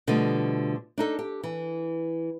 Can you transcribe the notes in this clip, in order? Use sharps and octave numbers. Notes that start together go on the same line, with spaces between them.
B2 D3 F3 G3 A3 D#5
D4 D#4 A4
G4
E3